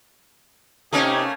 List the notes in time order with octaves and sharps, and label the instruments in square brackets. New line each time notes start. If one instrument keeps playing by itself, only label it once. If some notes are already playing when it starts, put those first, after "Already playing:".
[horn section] C3 D#4 G4 [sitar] A3 A#3 C#4